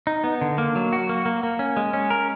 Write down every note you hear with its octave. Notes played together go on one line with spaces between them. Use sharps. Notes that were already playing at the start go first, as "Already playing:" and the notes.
D#4
B3
D3
A#3
F#3
F#4
A#3
A#3
A#3
C#4
G#3
C#4
A#4